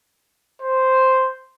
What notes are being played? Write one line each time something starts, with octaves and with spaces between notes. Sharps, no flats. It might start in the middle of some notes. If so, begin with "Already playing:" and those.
C5